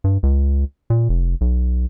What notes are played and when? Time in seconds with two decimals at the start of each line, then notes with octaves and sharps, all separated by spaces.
0.04 G2
0.23 C#2
0.90 A#2
1.09 F1
1.41 B1